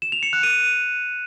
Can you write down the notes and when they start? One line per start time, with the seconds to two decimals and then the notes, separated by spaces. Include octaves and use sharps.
0.02 E7
0.12 F7
0.23 C#7
0.33 F#6
0.43 D#7